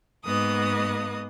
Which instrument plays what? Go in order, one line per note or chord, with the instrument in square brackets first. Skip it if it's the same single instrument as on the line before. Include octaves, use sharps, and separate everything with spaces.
[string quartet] G#2 A#3 B3 D#5 D#6